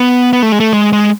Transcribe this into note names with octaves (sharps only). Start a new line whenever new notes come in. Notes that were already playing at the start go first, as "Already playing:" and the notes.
Already playing: B3
B3
A3
G#3
A3
G#3
G#3